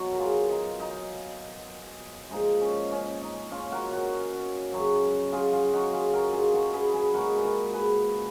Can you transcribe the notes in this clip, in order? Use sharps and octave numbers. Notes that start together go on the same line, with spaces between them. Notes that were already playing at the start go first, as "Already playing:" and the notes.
Already playing: B2 F#3 F#4
A#4
F4 G#4
D#4
D#4
A#2 F3 G#3 D#4
C#4
C#4
D#4
C#4 F4
F#4 A#4
F#4 A#4
F#2 C#3 F#3
F4 G#4
F4 G#4
D#4 F#4
F4 G#4
F#4 A#4
F4 G#4
F#4 A#4
G#4 B4
G#4 B4
A#2 G#3 F#4 A#4
B4
F#4 A#4
G#4 B4